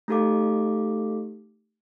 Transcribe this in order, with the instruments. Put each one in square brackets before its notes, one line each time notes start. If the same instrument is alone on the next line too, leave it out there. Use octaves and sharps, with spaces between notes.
[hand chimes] A3 D#4 G4 A4 F5 D6